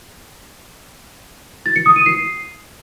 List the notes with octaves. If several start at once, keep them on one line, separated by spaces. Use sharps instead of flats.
A6
C#7
D#6
D#7
C7